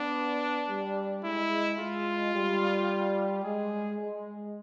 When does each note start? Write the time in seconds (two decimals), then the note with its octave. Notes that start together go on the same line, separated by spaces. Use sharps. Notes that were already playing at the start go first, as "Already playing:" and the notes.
Already playing: B3 D4
0.69 G3
1.24 G#3 E4
1.78 G#3 F4
2.34 G3
3.43 G#3 G#4
3.99 G#3